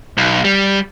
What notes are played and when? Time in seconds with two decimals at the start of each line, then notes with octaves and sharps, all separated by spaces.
0.17 B1
0.45 G3